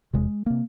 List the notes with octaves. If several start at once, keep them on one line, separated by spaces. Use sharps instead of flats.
F1 E2 C3 G#3
C3 A#3